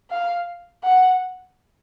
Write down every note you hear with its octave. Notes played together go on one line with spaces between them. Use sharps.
F5
F#5